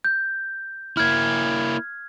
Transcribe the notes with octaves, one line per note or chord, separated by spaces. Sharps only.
G6
A#3 E4 F6 G#6